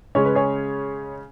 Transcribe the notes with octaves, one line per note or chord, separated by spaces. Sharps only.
C#3 G#3 C#4 C#5
B4
G#4 C#5